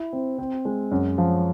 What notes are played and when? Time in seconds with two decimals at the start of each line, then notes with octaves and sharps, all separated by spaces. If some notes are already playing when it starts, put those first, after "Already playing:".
Already playing: E4
0.13 C4
0.38 C4
0.65 G#3
0.91 F#2
1.18 F3